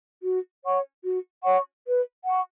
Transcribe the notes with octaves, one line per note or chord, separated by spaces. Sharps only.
F#4
C#5 F#5 C#6
F#4
C#5 F#5 C#6
B4
F#5 C#6